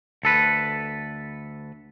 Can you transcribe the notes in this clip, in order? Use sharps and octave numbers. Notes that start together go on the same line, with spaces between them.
D2 A4 B4